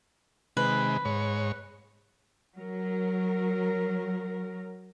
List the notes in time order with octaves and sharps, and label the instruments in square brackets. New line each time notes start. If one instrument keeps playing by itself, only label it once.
[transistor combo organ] C3 D#3 G#3 [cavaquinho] B4
[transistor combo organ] G#2 C#5
[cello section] F#3 A#4